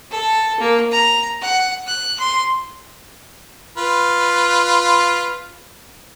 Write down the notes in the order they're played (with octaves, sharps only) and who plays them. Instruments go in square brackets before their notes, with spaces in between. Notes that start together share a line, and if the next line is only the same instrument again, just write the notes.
[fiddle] A4
A#3
A#5
F#5
F#6
C6
[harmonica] F4 B4